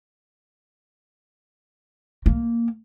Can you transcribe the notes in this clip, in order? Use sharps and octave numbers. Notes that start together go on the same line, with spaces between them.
A#3